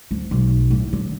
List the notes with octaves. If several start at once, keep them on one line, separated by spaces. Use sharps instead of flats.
D2
B1
A2
D3